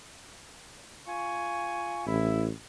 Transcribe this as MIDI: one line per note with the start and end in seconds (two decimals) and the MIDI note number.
1.07 2.06 65
1.07 2.06 80
1.07 2.06 85
2.07 2.50 33
2.07 2.43 64